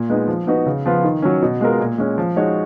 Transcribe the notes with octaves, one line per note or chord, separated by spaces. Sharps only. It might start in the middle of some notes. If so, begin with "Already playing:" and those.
Already playing: A#2
G#3 B3 D#4
F3
B3 D#4 F#4 B4
C#3
F3 B3 F4 B4
D#3
F#3 C#4
B2
G#3 B3 F4 A#4
A#2
G#3 C#4
F3
G#3 D#4 F#4 C#5